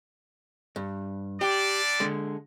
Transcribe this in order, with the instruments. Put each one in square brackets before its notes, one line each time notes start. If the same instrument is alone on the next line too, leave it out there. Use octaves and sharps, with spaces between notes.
[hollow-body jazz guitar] G2
[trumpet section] G3 D4 D5 [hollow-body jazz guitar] G4
[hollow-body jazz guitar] D3 G#3